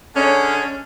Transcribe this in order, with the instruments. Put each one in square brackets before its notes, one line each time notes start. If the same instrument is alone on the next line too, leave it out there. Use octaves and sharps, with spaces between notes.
[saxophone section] D3 G#3 C#4